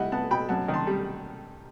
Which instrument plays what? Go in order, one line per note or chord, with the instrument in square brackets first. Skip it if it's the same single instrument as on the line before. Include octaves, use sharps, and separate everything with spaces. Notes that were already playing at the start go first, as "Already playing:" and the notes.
Already playing: [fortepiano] G3 E4 D#5 F#5
B3 F#5 A5
B2 G5 B5
F#2 F#5 A5
D#3
A5 C6
G3